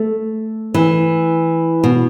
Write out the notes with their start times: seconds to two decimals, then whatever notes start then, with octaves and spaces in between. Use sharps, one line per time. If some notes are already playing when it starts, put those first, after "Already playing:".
Already playing: A3
0.74 E3
1.84 B2